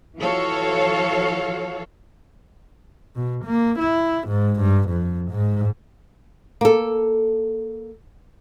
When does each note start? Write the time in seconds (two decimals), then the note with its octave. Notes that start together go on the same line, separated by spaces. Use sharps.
0.18 E3 F3 F#4 A4 C#5 F5
3.16 B2
3.45 A#3
3.79 E4
4.28 G#2
4.61 G2
4.89 F2
5.31 G#2
6.61 A#3 A4